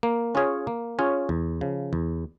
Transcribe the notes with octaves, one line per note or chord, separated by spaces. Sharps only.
A#3
C#4 F4 G#4 C#5
A#3
C#4 F4 G#4 C#5
E2
C#3 F3
E2